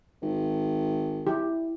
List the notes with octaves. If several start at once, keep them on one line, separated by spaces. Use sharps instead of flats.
G#1
E4 G4